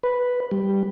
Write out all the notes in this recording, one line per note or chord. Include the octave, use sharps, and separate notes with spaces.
B4
G3